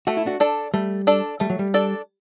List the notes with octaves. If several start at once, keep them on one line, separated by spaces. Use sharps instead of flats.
A3 F#4
E4
D4 F#4
D4 A4 D5
G3 A3
D4 A4 D5
G3 A3
F#3
G3
D4 A4 D5